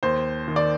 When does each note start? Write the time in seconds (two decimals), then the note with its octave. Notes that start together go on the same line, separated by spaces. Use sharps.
0.03 D#2 C5
0.48 D#3
0.56 D5